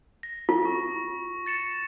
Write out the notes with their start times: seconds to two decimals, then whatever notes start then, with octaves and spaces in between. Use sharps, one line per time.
0.23 A#6
0.49 F4
0.65 C#6
1.46 A6 C#7 E7